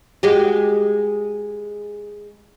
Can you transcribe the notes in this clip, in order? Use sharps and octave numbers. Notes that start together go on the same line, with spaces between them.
G#3 F#4 G4